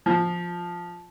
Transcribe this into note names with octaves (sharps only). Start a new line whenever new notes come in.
F3